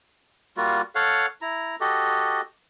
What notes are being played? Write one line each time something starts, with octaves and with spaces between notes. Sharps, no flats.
G3 A#3 F4 F#4
A4 C#5 F5 F#5
E4 A#5
F#4 G4 A4 D#5